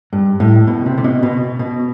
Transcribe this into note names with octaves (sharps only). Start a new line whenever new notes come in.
G2
A2
B2
C3
C3
B2
B2
B2